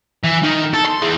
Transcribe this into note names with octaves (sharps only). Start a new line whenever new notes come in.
E3
D#3 D#4
A4
C6
E3 G#4